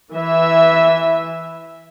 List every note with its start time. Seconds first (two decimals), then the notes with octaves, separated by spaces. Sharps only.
0.11 E3 E5